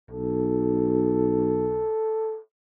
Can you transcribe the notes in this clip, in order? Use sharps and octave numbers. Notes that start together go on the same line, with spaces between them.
B1 A4